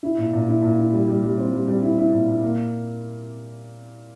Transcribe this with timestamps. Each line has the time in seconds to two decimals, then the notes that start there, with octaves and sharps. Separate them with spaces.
0.03 E4
0.18 A#2
0.33 A#2
0.48 E4
0.62 A#2
0.78 E4
0.93 G3
1.08 G3
1.23 G3
1.38 C4
1.53 G3
1.68 G3
1.83 E4
1.98 E4
2.13 A#2
2.28 A#2
2.43 A#3